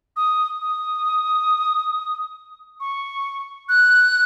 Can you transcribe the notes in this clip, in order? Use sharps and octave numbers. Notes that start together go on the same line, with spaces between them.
D#6
D#6
C#6
F#6